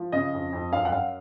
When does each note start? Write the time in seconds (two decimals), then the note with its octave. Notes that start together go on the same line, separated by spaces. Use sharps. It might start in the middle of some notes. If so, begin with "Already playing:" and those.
Already playing: F3
0.12 C#3 D#5
0.33 F2
0.53 F2
0.72 F#2 F5
0.85 F#5
0.92 F#2 F5